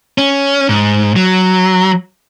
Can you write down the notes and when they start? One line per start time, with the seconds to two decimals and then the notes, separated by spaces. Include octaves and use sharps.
0.18 C#4
0.69 G#2
1.16 F#3